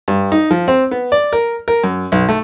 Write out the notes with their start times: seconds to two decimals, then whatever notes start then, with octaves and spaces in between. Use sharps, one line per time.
0.08 G2
0.32 D#4
0.51 F3
0.68 C4
0.91 B3
1.12 D5
1.33 A#4
1.68 A#4
1.84 F#2
2.12 B1
2.29 A3